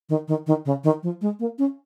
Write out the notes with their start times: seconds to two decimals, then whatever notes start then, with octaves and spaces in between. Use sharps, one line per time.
0.09 D#3
0.28 D#3
0.47 D#3
0.65 C#3
0.84 D#3
1.03 F3
1.21 G#3
1.40 A#3
1.58 C#4